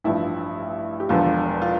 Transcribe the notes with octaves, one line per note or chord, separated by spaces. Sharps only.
A1 G2 F3 E4
G4
E1 E2 D3 F3 F4
F4